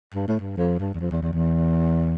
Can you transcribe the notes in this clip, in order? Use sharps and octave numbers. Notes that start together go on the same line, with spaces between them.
G2
A2
G2
F2
G2
E2
F2
E2
E2
E2